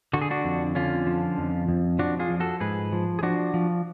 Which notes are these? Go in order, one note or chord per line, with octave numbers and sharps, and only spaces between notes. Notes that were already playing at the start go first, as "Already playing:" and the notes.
D3 F#4
G#4
D4 F#4
F2
D3 C#4 F4
F3
F2
F2
F3 D4 F#4
F4 G#4
F3
F#4 A4
G#2 G#4 B4
F3
G#4
F3 D4 F#4
F3